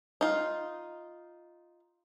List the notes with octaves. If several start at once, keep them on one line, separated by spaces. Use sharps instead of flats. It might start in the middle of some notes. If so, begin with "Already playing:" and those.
D#4 F4